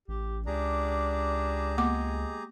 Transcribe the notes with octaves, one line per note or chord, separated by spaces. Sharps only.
A1 G4
C#2 D4 G4 G#4 A#5
G#3 A#3 B3 D6